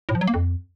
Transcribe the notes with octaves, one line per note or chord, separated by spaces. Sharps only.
A2
F3
F#3
A#3
F2